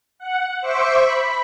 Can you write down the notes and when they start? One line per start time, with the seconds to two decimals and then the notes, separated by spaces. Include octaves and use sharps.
0.19 F#5
0.61 C5 E5 C#6 D6
1.01 B5